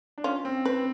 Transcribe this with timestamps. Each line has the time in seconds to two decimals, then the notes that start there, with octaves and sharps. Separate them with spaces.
0.18 D4
0.24 C#4 F4
0.45 C4
0.65 C4 B4